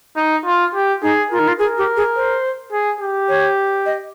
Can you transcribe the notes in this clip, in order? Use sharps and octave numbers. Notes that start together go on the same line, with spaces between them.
D#4
F4
G4
D#4 G#4
F4 A#4
D#4
F4
G#4 A#4
G4
G#4
C5
G#4
G4
C#5
D#5